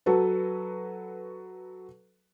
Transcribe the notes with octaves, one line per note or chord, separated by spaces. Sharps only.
F#3 F#4 A4 B4